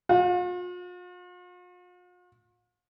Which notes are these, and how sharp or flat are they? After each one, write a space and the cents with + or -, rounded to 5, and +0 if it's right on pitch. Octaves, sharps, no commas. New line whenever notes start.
F4 +45